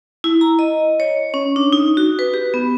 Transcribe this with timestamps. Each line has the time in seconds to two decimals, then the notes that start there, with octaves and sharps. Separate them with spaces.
0.24 E4
0.41 A#5
0.59 D#5
1.00 C#5
1.34 C#4
1.56 D4
1.73 D#4
1.97 F#4
2.19 B4
2.34 G4
2.54 B3